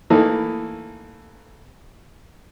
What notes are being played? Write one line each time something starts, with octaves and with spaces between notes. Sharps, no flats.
E3 A3 A#3 D#4 E4 A4